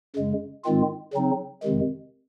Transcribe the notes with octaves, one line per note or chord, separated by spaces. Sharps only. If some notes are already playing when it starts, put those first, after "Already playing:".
F#2 C#3 G#3
G#2 D#3 G#3 C4 F4
C#3 F#3 C4 D#4
F2 C3 D#3 G#3